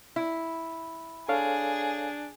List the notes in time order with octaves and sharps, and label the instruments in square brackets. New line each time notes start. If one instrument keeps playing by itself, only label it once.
[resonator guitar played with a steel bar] E4
[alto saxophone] D4 [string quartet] G#4 [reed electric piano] A4 C#5 F5